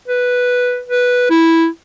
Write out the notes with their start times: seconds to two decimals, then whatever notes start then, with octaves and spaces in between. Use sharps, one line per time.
0.08 B4
0.89 B4
1.30 E4